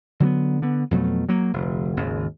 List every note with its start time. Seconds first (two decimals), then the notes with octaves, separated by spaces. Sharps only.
0.20 D3 F#3 A#3 B3
0.62 D3 B3
0.91 F2 B2 F#3 A3
1.29 F#3 A#3
1.53 F1 D2
1.97 G#1 D#2 C#3